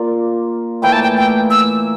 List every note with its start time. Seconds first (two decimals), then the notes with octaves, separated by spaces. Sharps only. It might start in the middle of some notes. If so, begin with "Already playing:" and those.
Already playing: A#3 F4 A#4 D5
0.82 A2 E3 A#3 E4 G5
0.92 A5
1.03 G5
1.17 G5
1.50 E6